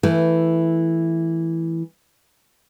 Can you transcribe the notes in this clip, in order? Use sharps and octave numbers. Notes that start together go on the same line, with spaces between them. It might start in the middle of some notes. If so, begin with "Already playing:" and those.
E3 A3